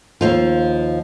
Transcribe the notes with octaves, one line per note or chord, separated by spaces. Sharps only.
D#2 F3 F4